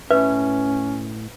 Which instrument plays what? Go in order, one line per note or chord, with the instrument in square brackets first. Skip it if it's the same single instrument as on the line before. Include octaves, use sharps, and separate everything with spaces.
[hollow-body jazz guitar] A2 E5 [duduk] C#4 [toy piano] B4